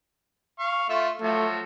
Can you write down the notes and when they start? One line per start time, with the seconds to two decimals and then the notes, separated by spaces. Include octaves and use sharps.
0.59 F5 C#6
0.89 A3 F4 E5
1.21 F3 F#3 A3